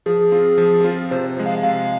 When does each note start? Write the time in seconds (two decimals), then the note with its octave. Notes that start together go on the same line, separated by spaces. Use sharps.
0.06 F3 G#4
0.32 C4 F4
0.58 F3
0.84 C4 F4
1.11 C3 C5
1.37 F3 G#3
1.46 F5
1.63 C3 F5